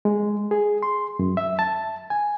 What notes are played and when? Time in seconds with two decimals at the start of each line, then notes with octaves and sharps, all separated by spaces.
0.05 G#3
0.51 G#4
0.83 C6
1.19 F#2
1.37 E5
1.59 A5
2.10 G#5